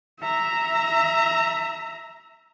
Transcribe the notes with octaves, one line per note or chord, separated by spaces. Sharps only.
E5 A#5